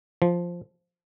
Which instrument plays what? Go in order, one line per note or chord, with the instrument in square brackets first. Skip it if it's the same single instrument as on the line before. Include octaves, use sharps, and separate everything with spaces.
[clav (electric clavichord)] F3